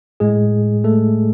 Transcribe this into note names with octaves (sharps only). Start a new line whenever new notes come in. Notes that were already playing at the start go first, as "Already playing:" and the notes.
A2 G#3 G#4
A3 A4